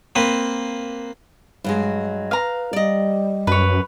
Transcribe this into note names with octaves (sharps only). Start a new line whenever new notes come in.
A#3 C4 B4
G2 F#3 G#3
B4 F5 A#5
G3 D5 D#5
F#2 B4 C#5